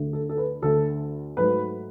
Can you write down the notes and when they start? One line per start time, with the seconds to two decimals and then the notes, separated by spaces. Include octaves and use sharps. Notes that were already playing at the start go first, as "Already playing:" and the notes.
Already playing: D2 D3 A3
0.13 A4
0.29 A4
0.38 B4
0.62 D2 D3 A3 A4
1.37 G#2 F#3 A3 B4